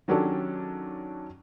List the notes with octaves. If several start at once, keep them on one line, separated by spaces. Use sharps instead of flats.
D#3 F#3 C#4 D4 G4 A4